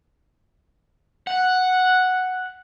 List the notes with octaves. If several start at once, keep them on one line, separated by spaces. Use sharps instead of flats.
F#5